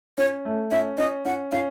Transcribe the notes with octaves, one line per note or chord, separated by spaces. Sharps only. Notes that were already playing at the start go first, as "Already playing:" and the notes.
C#4 C#5
A3
C#4 E5
C#4 D#5
C#4 F#5
C#4 F5